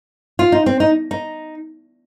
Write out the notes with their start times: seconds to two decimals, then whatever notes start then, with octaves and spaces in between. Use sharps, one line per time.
0.39 F4
0.52 D#4
0.66 C4
0.80 D#4
1.11 D#4